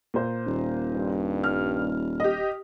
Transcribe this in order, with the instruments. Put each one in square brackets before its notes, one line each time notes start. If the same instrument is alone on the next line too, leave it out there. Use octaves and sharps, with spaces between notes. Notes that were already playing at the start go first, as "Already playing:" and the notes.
[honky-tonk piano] A#2 C5
[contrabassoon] D#1
[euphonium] G2
[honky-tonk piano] F6
G4 D#5